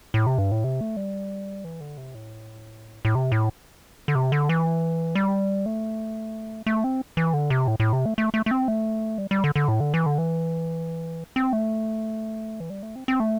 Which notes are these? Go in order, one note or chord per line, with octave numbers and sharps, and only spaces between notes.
A2
C3
G2
A2
C3
A3
G3
E3
D3
C3
A2
A2
C3
A2
D3
C3
D3
E3
G3
A3
A3
C4
E3
D3
C3
A2
A2
C3
A3
A3
A3
A3
C4
A3
G3
G3
D3
D3
A2
D3
E3
D3
E3
C4
A3
E3
G3
A3
C4
C4
A3